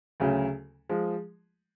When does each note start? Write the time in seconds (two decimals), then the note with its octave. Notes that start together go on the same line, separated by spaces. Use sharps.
0.20 D2 C#3 F#3 C#4
0.89 F3 G#3